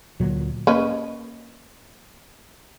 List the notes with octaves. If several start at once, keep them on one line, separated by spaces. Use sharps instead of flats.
D2 A#2 F#3
A#3 C#4 B4 D#5